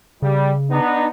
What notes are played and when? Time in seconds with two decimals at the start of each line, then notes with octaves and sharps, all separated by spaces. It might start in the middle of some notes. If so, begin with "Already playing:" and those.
0.22 C#3 G3
0.71 B3 D4 D#4